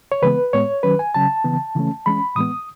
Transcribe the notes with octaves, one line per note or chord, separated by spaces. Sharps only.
C#5
C#3 E3 G#3 B3 B4
A2 G#3 B3 C#5
D#3 F#3 C#4 B4
G#5
C#3 F#3 C#4 A5
C#3 E3 B3
C#3 E3 A3 C#4
E3 G#3 C#4 B5
A2 E3 G#3 B3 D#6